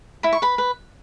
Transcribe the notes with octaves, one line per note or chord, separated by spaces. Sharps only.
E4 B5
C#6
B4 B5
B4